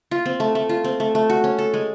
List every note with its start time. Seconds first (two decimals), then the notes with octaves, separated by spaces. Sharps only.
0.11 F4
0.25 C4
0.40 A3
0.55 A3
0.69 F4
0.84 C4
1.00 A3
1.15 A3
1.29 F#4
1.44 C#4
1.58 A4
1.74 G#3